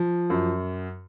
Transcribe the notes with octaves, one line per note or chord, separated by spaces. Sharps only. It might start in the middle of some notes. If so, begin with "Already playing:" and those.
Already playing: F3
F#2